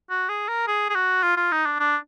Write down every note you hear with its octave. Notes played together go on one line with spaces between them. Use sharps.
F#4
G#4
A#4
G#4
G#4
F#4
F4
F4
D#4
D4
D4